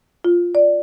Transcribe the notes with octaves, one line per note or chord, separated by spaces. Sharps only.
F4
D5